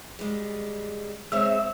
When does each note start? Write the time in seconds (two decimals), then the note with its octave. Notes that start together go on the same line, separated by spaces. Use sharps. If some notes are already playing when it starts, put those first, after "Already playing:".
0.19 G3 G#3
1.32 G#3 C4 C#5 E5